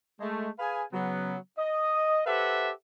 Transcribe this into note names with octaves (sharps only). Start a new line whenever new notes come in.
G#3 A3
G#4 B4 F5 G#5
C#3 F#3 B3
D#5
G4 A4 B4 C5 E5 F#5